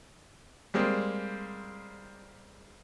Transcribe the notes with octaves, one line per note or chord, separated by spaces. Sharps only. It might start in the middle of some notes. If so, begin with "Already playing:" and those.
G3 G#3 A#3 C4